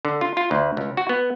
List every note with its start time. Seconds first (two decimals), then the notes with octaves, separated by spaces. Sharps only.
0.05 D3
0.21 F4
0.37 F4
0.51 D2
0.77 C#2
0.97 F#4
1.09 B3